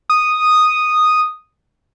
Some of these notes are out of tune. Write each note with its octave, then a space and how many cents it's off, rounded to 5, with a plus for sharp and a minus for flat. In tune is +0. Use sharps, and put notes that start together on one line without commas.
D#6 -5